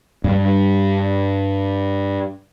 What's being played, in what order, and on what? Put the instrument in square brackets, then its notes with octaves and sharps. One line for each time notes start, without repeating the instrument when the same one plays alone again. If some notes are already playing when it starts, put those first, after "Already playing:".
[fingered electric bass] G2 G3